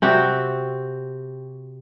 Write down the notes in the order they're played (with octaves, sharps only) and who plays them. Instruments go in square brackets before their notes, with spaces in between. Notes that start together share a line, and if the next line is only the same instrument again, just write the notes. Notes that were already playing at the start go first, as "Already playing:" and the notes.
[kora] C3 C4 F#4 G4